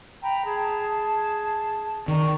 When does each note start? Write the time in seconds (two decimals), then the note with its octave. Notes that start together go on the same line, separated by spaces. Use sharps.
0.21 G5 A#5 B5
0.44 G#4 A5
2.08 D#3 D5 A#5 C#6